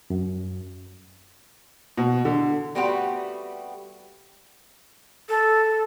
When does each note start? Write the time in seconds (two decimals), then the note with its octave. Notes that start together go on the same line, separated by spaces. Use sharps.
0.10 F#2
1.97 B2
2.25 D3
2.75 G3 A3 B3 C4 F#4 G4
5.29 A4